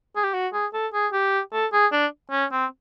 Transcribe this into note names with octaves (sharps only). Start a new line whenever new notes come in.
G#4
G4
F#4
G#4
A4
G#4
G4
A4
G#4
D4
C#4
C4